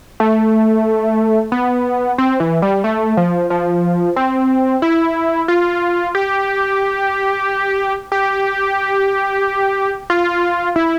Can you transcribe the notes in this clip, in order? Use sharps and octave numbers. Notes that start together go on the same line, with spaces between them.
A3
B3
C4
E3
G3
A3
F3
F3
C4
E4
F4
G4
G4
F4
E4